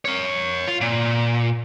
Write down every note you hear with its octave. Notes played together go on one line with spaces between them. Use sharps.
A#4 C#5
F4
A#2